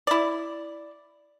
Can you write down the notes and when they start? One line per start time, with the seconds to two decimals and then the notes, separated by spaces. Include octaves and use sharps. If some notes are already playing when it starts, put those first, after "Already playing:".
0.07 E4 D5